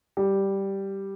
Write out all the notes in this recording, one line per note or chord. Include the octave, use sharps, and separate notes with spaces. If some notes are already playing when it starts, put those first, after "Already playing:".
G3